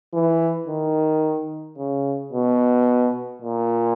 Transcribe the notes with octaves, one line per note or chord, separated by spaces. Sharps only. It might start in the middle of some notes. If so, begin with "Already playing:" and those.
E3
D#3
C#3
B2
A#2